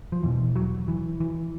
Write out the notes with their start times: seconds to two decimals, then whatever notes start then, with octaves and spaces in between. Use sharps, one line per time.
0.12 F3
0.23 E2 B2 E3
0.55 F#3
0.88 E3
1.20 E3